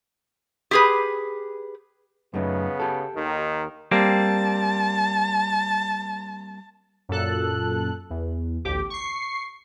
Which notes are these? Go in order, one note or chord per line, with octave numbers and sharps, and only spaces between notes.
G4 G#4 B4
F#2 C#3 A3 B3 D#4
G4 A4
D#2 D#3
G3 A#3 C4 A5
F#2 A#2 A4 F#6
E2
A1 D2 G4 D6
C#6 C7